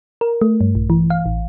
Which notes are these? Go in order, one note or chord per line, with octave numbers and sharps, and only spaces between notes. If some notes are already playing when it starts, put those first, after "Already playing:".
A#4
A3
G2
A#1
E3
F5
A1